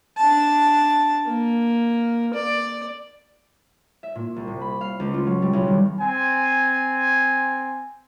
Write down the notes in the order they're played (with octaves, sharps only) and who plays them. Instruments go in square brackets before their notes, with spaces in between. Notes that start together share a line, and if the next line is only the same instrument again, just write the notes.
[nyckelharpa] D4 A5
A#3
D5
[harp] E5
A#2
C2
C3
B5
F5
C#2
F4
F#3
G3
B1
D#3
[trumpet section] C4 G#5